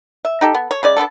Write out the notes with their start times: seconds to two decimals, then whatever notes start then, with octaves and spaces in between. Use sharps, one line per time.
0.25 E5
0.41 D#4 G4 A4
0.55 B3
0.71 C#5
0.83 C#3 G#3 D5
0.97 B3 C4 D4 A4